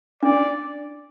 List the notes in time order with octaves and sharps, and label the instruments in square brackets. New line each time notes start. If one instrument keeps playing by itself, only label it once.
[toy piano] D4 [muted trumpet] D5